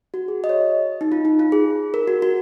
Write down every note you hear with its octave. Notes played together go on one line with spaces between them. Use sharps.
F#4
G#4
D#5
C#5
D#4
F4
D#4
F4
G#4
A#4
F#4
F#4